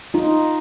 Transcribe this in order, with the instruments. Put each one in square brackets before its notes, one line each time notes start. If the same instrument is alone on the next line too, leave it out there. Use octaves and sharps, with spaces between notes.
[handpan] D#4 F4